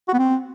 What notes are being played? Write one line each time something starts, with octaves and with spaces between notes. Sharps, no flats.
F#4
B3
C4